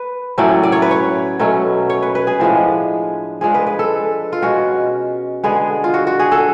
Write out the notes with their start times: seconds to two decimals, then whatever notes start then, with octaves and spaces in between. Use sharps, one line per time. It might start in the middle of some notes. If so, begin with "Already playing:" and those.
Already playing: B4
0.38 A2 F#3 A3 C#4 D5
0.63 D5
0.72 C#5
0.82 B4
0.91 C#5
1.40 B2 F#3 A3 C#4
1.90 C#5
2.02 B4
2.15 B4
2.27 G#4
2.40 A2 F3 G#3 D4
3.41 F3 G#3 D4 G#4
3.54 B4
3.67 B4
3.79 A4
4.32 F4
4.42 B2 G#3 C#4 F#4
5.44 D3 G#3 B3 G#4
5.84 F4
5.94 F#4
6.07 F#4
6.19 G#4
6.32 A4